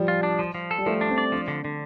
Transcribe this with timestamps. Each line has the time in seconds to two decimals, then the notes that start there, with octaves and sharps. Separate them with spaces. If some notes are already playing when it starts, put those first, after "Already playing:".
Already playing: F3 G3
0.08 F4
0.23 D4
0.39 F3
0.55 F3
0.71 A4
0.78 G3
0.86 F3 A3
1.01 D4
1.10 C4
1.18 D5
1.32 F3 D4
1.48 D3
1.65 D3